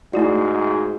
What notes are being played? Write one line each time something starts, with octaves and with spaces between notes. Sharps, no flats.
G#2 A3 E4 F#4 D5